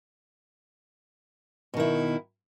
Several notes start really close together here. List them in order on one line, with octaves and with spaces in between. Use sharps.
B2 D#3 E4